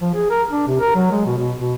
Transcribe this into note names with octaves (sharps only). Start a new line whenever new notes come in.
F3
G#4
A#4
D4
C3
A#4
F#3
G#3
B2
B2
B2